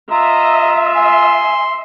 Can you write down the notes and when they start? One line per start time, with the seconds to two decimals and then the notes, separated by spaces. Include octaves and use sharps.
0.11 F4 D#5 E5 A#5
0.95 G#5 C6